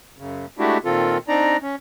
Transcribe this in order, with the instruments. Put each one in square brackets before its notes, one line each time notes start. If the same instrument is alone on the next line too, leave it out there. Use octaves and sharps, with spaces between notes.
[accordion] F#2 C#3
G#3 A3 D4 E4 F#4 G4
A#2 D#3 C4 F4 A4
C4 D4 D#4 D5 A#5
C#4